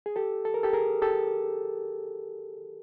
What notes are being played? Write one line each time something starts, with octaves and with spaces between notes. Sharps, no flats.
G#4
G4 A4
A4
A#4
G4 A4
G#4 A#4
G4 A4